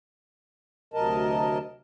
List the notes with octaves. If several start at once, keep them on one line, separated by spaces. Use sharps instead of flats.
D2 C3 F#3 A#4 D#5 A5